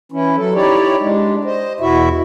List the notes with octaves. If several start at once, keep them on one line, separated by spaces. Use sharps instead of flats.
E3 C#4 E4
F#3 A4
D#4 E4 G4 C#5 D5
G3 G#3 D4
C5 D#5
E2 B2 E4 F#4 E5